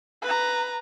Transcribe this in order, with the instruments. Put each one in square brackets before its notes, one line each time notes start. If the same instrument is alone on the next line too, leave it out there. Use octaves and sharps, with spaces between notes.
[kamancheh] B4 A#5